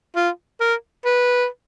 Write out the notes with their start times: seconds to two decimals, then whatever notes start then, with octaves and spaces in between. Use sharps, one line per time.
0.16 F4
0.60 A#4
1.05 B4